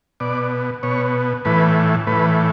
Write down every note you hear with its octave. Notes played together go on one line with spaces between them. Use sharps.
B2 D5
B2 C#5
A2 E3 B4
A2 E3 B4